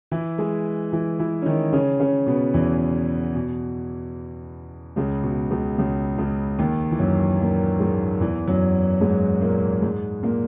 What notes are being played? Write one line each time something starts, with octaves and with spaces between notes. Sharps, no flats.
E3 E4
G#3 G#4
E3 E4
E3 E4
C#4
D#3 D#4
C#3 C#4
C#3 C#4
B2 B3
E2 E3
B2
C#2 C#3
B2
C#2 C#3
C#2 C#3
C#2 C#3
D#2 D#3
E3
F#2 F#3
A#2 A#3
G#2 G#3
E2 E3
F#2 F#3
G#2 G#3
A#2 A#3
G#2 G#3
A#2 A#3